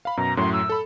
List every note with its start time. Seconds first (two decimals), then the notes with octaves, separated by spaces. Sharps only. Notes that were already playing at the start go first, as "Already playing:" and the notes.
0.05 F5 B5
0.17 F#2 B2 A#5
0.37 F#2 A2 F#3 C6
0.53 E6
0.69 A4 B5